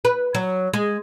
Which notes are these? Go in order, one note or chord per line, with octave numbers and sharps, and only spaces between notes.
B4
F#3
G#3